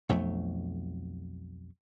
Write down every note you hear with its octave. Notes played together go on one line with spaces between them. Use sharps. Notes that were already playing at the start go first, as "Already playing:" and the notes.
B1 F2 A3